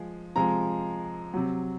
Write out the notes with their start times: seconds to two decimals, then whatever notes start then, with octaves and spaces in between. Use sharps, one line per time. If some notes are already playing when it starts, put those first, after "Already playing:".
Already playing: F3 G#3
0.36 C3 F3 G#3 A#5
1.34 C3 F#3